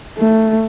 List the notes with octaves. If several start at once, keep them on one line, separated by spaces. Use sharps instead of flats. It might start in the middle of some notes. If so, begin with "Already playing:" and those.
A3